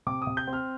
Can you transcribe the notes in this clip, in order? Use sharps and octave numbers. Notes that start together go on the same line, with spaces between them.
C3 D6
D#6
C3
G6
C4
F6